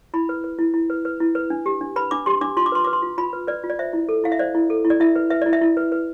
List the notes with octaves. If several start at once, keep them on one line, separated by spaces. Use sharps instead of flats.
E4 B5
B4
B4
E4
E4
B4
B4
E4
B4
D4
G4
D4
B4 B5
D4 D6
G4 C6
D4 D6
F4 C6
D6
B4 C6
B4 D6
C6
F4
F4 B5
B4
B4 D5
F4
D5
C5 E5
E4
A4
E4 F5
E5
C5 D5
E4
A4
E4
D5
E4 E5
B4
B4 E5
E4 D5
E5
E4
B4
B4